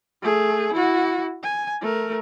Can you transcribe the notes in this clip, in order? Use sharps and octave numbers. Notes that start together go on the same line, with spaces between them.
A3 G#4
E4 F#4
G#5
A3 A#4